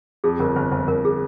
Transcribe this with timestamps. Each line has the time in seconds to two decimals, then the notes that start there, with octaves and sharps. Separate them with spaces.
0.24 F2 G#4
0.40 G1 A#4
0.56 G1 C5
0.72 G1 C5
0.88 G1 A#4
1.05 G#4